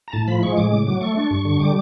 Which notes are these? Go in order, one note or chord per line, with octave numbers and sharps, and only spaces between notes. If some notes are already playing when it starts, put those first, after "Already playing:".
A#5
A2 A5
F3 B5
G#3 C#6
A2 D6
C#3
F#3
A3 C#6
D4
G2
D3
G3 D6